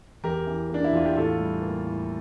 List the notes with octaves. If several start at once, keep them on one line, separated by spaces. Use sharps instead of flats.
E2 G4 A#4
E3
A#3 D4
E4
E2 F4
G4
A2 F4 A4
G3
A#3
A2